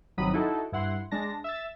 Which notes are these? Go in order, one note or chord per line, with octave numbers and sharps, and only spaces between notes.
G1 C3 D#3 F#3 B5 D#6
D#4 E4 F#4 A4
G2 E4 F#5 C6
G#3 D4 A5 A#6
E5 E6 A6